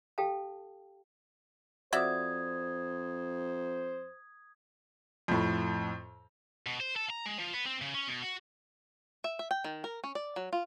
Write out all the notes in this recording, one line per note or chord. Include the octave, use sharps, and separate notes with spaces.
G4 A4 F5 G5 A5
F2 F#4 C5 D5 E5 D#6 G#6
F2 A2
B2
C5
A4
A#5
G#3
F3
B3
C4
C#3
C#4
B2
F#4
E5
E5
G5
D#3
A#4
C#4
D5
F#3
F4